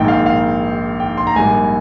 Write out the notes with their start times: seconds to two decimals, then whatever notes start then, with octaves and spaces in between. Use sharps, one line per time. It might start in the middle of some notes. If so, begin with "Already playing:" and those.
Already playing: A#1 G#2 D#3 A#3 G5
0.08 F5
0.26 F5
1.00 G5
1.17 C6
1.27 A#5
1.36 A#1 G#2 G3 A#3 G#5